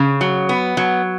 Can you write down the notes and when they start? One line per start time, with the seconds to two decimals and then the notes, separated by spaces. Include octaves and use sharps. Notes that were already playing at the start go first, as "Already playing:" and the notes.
Already playing: C#3
0.21 F#3
0.49 B3
0.77 F#3